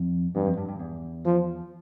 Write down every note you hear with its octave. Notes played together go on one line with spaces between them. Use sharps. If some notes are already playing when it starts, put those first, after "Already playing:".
Already playing: F2
E2 G2
F2
G2
G2
E2
F3